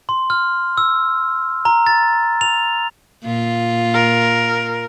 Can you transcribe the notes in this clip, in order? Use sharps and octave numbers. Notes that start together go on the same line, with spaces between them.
C6
F6
E6
A#5
A6
F7
A#2 F4
A#4